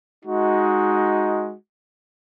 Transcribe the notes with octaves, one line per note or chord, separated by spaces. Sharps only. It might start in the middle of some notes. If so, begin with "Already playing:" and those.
G#3 D#4 F#4